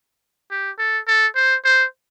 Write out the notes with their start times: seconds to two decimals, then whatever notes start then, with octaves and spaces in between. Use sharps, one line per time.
0.51 G4
0.79 A4
1.07 A4
1.35 C5
1.65 C5